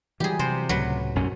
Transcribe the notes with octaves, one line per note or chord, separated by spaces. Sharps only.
E3 F#3 G3 G4 G#4
C3 C5
C#2 A2 F#3 B4
B1 F#2 C#4